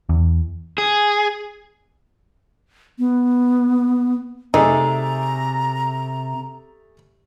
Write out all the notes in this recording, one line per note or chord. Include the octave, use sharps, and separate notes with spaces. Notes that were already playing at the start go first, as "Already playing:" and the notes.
E2
G#4
B3
C3 A3 D#4 G#4 D5 A#5